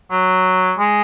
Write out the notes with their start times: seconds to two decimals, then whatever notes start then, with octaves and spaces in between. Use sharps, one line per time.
0.11 F#3
0.78 G#3